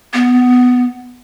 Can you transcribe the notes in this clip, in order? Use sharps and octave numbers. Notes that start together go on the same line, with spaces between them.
B3